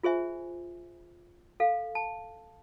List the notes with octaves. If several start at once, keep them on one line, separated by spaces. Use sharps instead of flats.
F4 G#4 C5 E5 G#5
A4 F5
A5